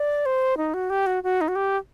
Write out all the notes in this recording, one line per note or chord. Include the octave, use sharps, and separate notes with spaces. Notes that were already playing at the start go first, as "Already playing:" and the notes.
Already playing: D5
C5
D#4
F#4
G4
F#4
F#4
D#4
F#4
G4